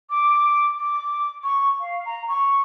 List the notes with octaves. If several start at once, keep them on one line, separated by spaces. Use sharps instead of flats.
D6
D6
C#6
F5
A#5
C#6